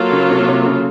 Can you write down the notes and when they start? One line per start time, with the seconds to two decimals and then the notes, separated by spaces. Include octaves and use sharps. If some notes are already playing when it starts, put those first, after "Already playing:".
Already playing: F#3 A#3 F4 A4
0.12 C#3
0.30 C3
0.48 C3
0.65 C#3